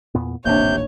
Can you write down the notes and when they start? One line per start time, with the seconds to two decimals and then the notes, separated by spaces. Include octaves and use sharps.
0.15 E2 A#2 B3
0.45 D#1 A1 D#2 C3 A#3 D4 C#5 G6